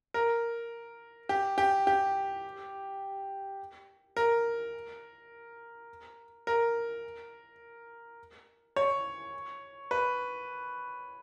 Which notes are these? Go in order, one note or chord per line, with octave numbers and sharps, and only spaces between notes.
A#4
G4
G4
G4
A#4
A#4
C#5
B4